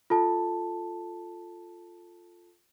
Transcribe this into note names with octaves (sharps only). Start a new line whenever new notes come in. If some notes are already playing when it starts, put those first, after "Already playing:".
F4 A4 A5